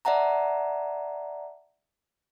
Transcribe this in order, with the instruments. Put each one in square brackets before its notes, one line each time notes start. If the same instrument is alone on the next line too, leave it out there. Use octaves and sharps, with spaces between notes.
[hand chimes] D5 E5 F#5 A5 A#5